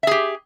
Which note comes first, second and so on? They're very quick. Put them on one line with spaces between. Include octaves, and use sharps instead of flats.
E5 G#4 G4